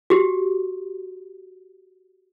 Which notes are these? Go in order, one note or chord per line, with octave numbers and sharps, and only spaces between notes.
F#4 G4